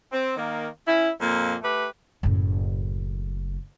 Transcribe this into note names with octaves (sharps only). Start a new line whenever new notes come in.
C4
D#3 A#3
C#4 E4
F2 A#2 A#3
A3 G4 B4
F#1 A2